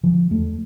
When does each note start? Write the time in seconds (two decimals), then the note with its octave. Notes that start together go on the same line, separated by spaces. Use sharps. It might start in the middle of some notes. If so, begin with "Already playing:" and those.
0.03 D3 F3
0.30 E2 A3